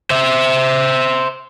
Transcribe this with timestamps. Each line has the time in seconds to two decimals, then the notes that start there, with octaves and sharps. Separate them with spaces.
0.10 C5 E5